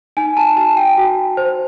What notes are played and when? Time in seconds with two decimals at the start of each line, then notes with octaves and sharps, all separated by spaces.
0.17 D#4 G#5
0.37 A5
0.56 F#4 A5
0.77 G5
0.97 F#4
1.37 C5